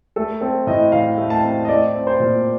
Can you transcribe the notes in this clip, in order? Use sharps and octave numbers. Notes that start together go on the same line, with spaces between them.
A3 A4
C4 A4
A2 D#5
A2 F5
A3
A5
C4
D#5
A3 D5
C4
C5
A#2